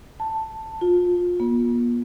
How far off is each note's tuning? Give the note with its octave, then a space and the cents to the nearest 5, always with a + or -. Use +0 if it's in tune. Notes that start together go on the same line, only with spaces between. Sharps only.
A5 +10
F4 +25
B3 -45